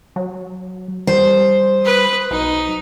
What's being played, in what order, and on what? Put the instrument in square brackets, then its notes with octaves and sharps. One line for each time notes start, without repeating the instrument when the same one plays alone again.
[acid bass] F#3
[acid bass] G3 [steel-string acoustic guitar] C5
[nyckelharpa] B4 D#6
[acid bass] B1 [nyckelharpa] D#4